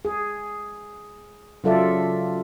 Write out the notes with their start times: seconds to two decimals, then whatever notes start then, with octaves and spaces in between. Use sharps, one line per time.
0.05 G#4
1.64 C#3 F#3 F4 A4 D5 E5